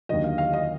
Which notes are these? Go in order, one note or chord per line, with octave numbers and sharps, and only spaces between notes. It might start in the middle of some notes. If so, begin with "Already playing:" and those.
D#2 D3 F#3 D#5
F5
F5
D#5